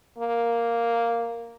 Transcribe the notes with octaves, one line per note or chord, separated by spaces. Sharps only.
A#3